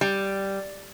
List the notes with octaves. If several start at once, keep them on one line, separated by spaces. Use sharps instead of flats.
G3